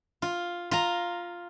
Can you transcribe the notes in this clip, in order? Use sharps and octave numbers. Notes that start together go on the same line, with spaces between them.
F4
F4 A#5